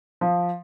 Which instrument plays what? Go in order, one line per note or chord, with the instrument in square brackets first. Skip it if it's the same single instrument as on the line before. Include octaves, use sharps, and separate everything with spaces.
[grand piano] F3